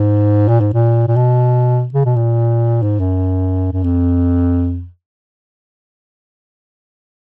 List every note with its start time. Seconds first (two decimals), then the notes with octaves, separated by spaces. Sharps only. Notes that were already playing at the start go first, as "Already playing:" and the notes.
Already playing: G#2
0.48 A#2
0.60 G#2
0.73 A#2
1.08 A#2
1.16 B2
1.94 C#3
2.05 B2
2.16 A#2
2.83 G#2
3.00 F#2
3.72 F#2
3.83 F2